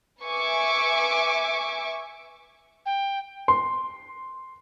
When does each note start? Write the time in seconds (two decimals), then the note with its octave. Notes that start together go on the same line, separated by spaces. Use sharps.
0.22 B4 E5 G#5 C#6 D6
2.86 G5
3.48 C6